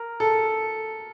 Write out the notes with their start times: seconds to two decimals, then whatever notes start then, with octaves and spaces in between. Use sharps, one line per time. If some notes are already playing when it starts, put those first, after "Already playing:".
Already playing: A#4
0.20 A4